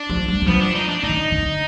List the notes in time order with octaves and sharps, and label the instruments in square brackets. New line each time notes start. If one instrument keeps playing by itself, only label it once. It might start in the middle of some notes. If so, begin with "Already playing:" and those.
Already playing: [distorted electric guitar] D4
[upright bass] F3
G3
G3
[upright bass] F3 [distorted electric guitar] B3
[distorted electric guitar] D4
D#4
D4
[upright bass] D#3 [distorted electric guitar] D#4
[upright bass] D3